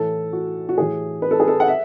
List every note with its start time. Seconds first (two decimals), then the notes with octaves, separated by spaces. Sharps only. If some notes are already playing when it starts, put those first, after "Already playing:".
Already playing: A2 E3 A4
0.33 F#4
0.69 F#4
0.78 A2 E3 G#4
1.22 B4
1.31 A4
1.40 G#4
1.48 A4
1.60 F#5
1.68 E5